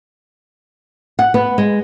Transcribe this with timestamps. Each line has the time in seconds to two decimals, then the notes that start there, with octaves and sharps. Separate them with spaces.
1.19 F#5
1.34 B3
1.58 G#3